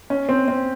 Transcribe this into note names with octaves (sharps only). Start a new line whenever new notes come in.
C#4
C4
C4